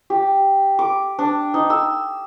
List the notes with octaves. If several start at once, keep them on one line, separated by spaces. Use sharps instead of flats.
G4
D6
D4
D#4
E6